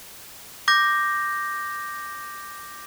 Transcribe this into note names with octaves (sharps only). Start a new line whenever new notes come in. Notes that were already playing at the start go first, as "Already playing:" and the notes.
D6 G6 A#6